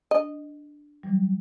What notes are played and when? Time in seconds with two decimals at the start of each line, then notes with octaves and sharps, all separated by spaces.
0.11 D4 D#5
1.03 E3 F#3 G3